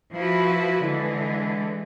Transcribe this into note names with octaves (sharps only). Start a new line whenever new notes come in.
F3 E4 F#4 B4
D3 E3 G#3